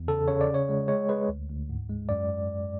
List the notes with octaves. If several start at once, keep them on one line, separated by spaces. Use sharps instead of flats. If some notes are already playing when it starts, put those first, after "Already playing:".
Already playing: E2
C#3 A4
C#3 C#5
D5
C#3
C#5
G#3
G#3 C#5
G#3 B4
D2
D2
G#2
G#3
F#2 D5